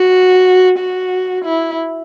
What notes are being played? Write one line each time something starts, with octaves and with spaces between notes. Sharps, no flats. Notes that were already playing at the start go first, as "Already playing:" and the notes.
Already playing: F#4
F#4
E4